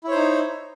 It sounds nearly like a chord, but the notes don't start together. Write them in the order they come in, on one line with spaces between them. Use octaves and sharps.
E4 C#5 C5 D#4